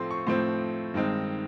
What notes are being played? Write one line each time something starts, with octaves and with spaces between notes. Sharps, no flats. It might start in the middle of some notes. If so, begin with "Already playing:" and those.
Already playing: A2 F3 A3 C4 C6
C#6
A2 F3 A3 C4 C6
G2 D#3 G#3 C4 D#4